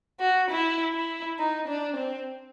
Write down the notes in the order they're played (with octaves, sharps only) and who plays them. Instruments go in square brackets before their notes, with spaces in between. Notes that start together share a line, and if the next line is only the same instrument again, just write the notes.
[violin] F#4
E4
E4
D#4
D4
C4